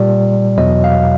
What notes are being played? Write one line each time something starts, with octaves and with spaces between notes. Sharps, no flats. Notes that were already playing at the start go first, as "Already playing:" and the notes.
Already playing: A#2 G3 D5
E2 B2 F#3 D#5
F5